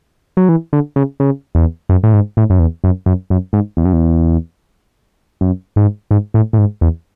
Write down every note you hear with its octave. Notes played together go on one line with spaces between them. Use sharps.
F#3
E3
D3
C#3
C#3
E2
F#2
A2
G#2
A2
F#2
E2
F#2
F#2
F#2
G#2
E2
F#2
E2
F#2
G#2
G#2
A2
A2
G#2
E2